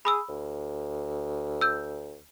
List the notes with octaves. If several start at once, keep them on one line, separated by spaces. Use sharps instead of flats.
G#4 B5 D#6 E6
D2
E6 G6